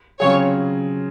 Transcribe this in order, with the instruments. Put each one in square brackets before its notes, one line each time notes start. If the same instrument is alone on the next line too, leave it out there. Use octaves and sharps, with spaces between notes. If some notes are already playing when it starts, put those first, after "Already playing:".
[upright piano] C#3 F#3 C4 F4 G#4 [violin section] C#5